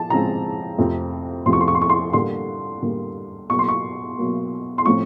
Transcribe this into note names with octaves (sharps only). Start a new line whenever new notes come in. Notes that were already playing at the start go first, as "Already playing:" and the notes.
Already playing: F3 A5
C#3 F3 G#3 C4 A#5
F2 C3 F3 A3 C4
F2 C3 F3 A3 C4 C6
C#6
C6
C#6
C6
C#6
C6
D3 G3 A#3 C6
D3 G3 A#3
B2 F#3 A#3 C#6
C6
C#6
B2 F#3 A#3
C6
A2 F3 A3 C4 C#6